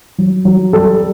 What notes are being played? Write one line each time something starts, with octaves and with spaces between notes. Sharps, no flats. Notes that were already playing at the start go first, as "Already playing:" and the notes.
F#3
F#3
G3 A4